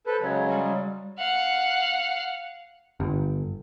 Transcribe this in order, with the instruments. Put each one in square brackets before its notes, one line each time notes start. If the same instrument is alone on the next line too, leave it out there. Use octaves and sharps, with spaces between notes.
[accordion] A4 B4 [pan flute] C5
[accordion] C#3 F#3 G#3 [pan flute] C#5
[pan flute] G3
[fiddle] F5 F#5
[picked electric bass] G1